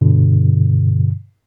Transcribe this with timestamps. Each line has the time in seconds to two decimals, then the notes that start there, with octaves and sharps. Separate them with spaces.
0.01 G2 B2 D3